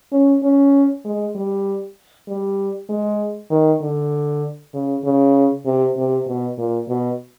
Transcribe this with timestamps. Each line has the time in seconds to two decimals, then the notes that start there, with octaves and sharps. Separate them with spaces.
0.12 C#4
0.43 C#4
1.05 G#3
1.35 G3
2.27 G3
2.89 G#3
3.51 D#3
3.81 D3
4.74 C#3
5.04 C#3
5.66 C3
5.96 C3
6.27 B2
6.58 A#2
6.89 B2